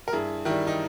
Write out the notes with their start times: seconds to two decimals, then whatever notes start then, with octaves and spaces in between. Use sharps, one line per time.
0.08 A#4
0.13 G2 E4 G#4
0.45 D#3 G3 E4
0.67 D#4